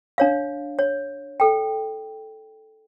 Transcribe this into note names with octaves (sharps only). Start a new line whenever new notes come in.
D4 C#5 F5
C#5
A4 G5